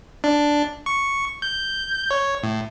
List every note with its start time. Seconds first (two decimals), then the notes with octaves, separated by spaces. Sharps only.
0.24 D4
0.86 C#6
1.42 G6
2.11 C#5
2.43 A2